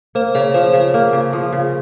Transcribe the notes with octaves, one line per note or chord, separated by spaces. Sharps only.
A#3 C5
C#3 C#5
F3 C5
C#3 C5
A#3
C#3
F3
C#3